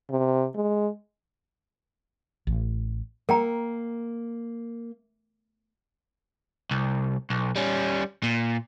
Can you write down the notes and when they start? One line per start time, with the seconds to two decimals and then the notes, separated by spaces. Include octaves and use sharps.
0.10 C3
0.55 G#3
2.47 A1
3.29 A#3 A#4 G5 A#5
6.71 C2
7.30 B1
7.56 G3 C#4
8.23 A#2